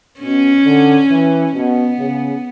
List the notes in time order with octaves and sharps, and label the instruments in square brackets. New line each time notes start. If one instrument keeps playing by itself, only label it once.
[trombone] B2 [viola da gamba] C#4
[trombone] D3
E3
[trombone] B2 [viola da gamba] B3
[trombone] C#3